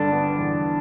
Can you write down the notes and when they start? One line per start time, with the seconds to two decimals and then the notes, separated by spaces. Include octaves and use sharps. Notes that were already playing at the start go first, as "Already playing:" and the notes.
Already playing: G2 D3 D4
0.12 B3
0.39 E2